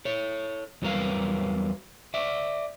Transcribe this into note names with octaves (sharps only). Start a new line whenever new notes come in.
A4 C#5
E2 F#3 G3 A#4 B4 F5
D5 E5